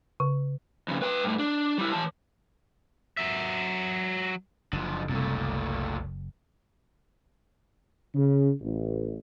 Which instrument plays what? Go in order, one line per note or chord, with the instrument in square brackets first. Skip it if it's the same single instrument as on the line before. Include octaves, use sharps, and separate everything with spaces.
[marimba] C#3
[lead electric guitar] F2 C#3
B4 G5
G2 A3
D4
G3 E4
E3 A5
F#3 E5
[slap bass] F#1 [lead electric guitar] D3 F3
[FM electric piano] C2 [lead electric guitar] A#2 A3
[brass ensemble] C#3
A1